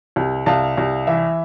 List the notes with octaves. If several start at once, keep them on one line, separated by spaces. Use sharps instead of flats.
C2
C2 F5 A5
C2
E3 E5